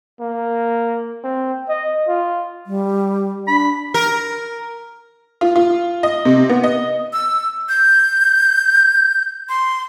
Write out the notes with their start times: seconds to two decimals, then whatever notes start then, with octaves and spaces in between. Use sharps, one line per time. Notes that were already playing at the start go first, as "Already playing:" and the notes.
0.20 A#3
1.24 C4
1.69 D#5
2.08 F4
2.66 G3
3.48 D4 B5
3.94 A#4
5.41 F4
5.56 F4
6.03 D#5
6.25 C3
6.49 B3
6.64 D#5
7.13 E6
7.69 G6
9.49 C6